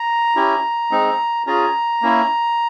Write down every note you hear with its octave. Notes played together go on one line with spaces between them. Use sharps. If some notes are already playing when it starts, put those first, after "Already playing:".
Already playing: A#5
C#4 E4 G4
G#3 C4 D#4
C#4 F4 G#4 A#5
A#3 C#4 E4